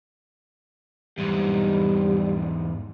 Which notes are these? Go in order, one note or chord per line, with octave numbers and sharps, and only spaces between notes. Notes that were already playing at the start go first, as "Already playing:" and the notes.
E2 G#2 G3